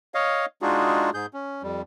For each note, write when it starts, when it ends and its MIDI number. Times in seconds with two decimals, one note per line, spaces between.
0.14 0.46 73
0.14 0.46 75
0.14 0.46 77
0.62 1.10 56
0.62 1.10 62
0.62 1.10 63
0.62 1.10 65
0.62 1.10 66
0.62 1.10 68
1.14 1.26 44
1.14 1.26 68
1.14 1.26 91
1.34 1.63 61
1.63 1.82 41
1.63 1.82 55